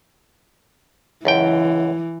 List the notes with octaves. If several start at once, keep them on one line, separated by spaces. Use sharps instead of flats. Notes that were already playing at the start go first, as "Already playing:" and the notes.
C#2 F#2 E3 G5